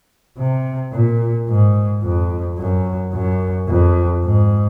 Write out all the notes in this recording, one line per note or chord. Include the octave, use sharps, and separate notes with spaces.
C3
A#2
G#2
F2
F#2
F#2
F2
G#2